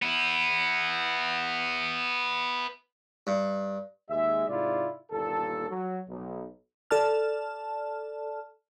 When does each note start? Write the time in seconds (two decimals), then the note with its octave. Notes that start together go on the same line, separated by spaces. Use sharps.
0.02 B3 E4
3.27 G2
4.10 D#2 G#3 E5
4.49 G#2 C3 E4 F4 D5
5.11 G1 D#2 A#2 A4
5.70 F#3
6.08 B1
6.91 A4 D5 A5 F6